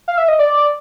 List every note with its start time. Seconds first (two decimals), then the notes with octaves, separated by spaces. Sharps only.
0.08 F5
0.18 E5
0.28 D#5
0.39 D5